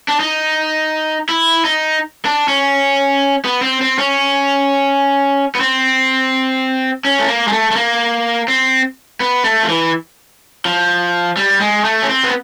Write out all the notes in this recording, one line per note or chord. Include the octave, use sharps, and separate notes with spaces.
D4
D#4
E4
D#4
D4
C#4
B3
C4
C4
C#4
B3
C4
C#4
A3
A#3
G#3
A3
A3
A#3
C4
B3
A3
F3
E3
F3
G3
G#3
A3
C#4
C4
B3